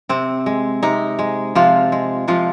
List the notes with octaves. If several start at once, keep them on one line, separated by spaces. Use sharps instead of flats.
C3 C4
G#3
C3 D#4
G#3
C3 F3 F4
G#3
C3 F3 F4